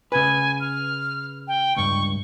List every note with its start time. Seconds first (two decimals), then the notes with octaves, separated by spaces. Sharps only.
0.12 C#3 B4 G#5
0.60 F6
1.48 G5
1.76 C#2 G2 C#6